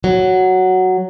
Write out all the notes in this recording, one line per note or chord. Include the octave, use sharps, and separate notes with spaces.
F#3